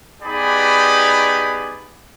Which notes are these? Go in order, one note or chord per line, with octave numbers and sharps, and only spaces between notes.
B3 D#4 G4 G#4 D5 B5